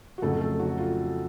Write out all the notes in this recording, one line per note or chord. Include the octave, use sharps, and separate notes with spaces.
F#4
F2 C#3 F#3 A3 A4
A3 A4
F#3 F#4
F4